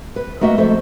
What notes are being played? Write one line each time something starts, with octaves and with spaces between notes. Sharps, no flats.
B4
A3 A#3 F#4 D#5 E5
F2 A3 A4 C5 E5